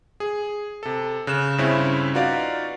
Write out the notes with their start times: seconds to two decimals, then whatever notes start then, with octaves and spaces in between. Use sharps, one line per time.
0.20 G#4
0.83 C3 A4
1.27 C#3 F#6 E7
1.58 G2 C#3 C4 C#4 E4
2.14 D#4 F4 F#4 B4 D5 F5